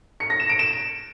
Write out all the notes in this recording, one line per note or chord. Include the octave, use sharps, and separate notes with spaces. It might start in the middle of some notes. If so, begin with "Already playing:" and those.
C#7
A#6
E7
D7
E7